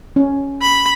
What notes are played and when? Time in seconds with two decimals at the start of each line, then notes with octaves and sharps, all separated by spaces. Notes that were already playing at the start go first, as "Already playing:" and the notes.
0.16 C#4
0.62 B5